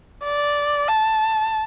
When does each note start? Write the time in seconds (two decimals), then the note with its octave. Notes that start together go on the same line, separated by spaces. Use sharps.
0.24 D5
0.88 A5